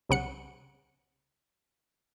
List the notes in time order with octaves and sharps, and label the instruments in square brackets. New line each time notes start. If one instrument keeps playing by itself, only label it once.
[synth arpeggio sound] C2 C#3 F#5 C#7